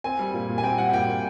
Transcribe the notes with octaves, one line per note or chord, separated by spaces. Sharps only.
C4 G#5
G3
A#2
A#2
G#5
C4 G5
G3 F#5
A#2 G5
A#2